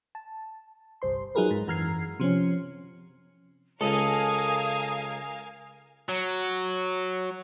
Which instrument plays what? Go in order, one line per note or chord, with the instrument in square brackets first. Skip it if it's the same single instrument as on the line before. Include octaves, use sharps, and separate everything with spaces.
[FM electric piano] A5
G1 C2 C5 C6
F#3 D#4 F4 G#4 A#4 B4
G#2
F#2 E3 A#5 F6 G#6 C7
C3 F3 C4 C#4
[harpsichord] C#2 [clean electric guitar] A4 [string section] A#4 F5 G#5 [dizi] D#6
[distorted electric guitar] F#3